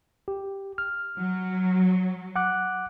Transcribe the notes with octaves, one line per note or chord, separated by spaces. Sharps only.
G4
F6
F#3
F#5 D6 F#6